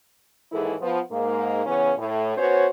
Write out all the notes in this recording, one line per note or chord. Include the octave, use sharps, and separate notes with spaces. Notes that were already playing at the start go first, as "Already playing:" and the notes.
D#2 G#2 E3 E4 G#4 A4
F3 B3
G#2 A#3
C#3 E3 B3 C#4
A2
B3 C#4 F#4 C5 C#5